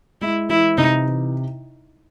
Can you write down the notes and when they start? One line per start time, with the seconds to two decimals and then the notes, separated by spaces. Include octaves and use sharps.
0.22 G#3 E4
0.49 E3 E4
0.78 C3 D#4
1.07 E3